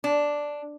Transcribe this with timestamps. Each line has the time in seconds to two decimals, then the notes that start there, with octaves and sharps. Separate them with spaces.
0.04 D4